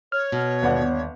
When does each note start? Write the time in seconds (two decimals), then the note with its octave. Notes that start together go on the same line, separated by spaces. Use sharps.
0.12 C#5 F6
0.32 B2
0.63 G1 D#2 D5 F#5